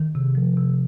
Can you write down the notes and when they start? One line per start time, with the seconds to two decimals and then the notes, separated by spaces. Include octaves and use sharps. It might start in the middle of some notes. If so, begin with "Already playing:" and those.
Already playing: D#3
0.15 C3
0.35 F3
0.57 C3